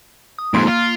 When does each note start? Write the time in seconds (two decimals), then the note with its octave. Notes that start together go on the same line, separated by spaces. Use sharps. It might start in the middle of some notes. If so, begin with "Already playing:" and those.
0.38 D#6
0.54 F2 G#2 A#3 C6 D7
0.67 F4